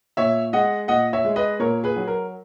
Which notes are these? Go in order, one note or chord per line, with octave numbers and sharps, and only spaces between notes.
A#2 C#5 E5
G#3 D#5 F#5
A#2 D#5 F#5
C#5 E5
G#3
B4 D#5
A#2 A#4 C#5
G#4 B4
F#3
A#4